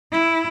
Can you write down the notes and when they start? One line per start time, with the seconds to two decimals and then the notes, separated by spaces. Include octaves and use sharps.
0.12 E4